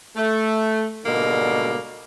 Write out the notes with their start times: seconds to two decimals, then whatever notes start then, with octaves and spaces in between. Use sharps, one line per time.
0.16 A3
1.05 G#2 B2 D3 G3 G#3 A#3